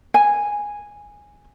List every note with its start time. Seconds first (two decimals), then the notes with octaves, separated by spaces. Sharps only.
0.14 G#5